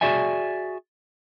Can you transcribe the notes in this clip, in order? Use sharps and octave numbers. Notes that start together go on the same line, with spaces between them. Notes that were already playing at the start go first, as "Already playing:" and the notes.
F#4 G#4 D5 E5 G#5